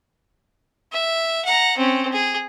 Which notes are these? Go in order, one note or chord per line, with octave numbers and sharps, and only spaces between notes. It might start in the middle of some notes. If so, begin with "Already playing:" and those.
E5
F#5 A#5
C4 C#4
G#4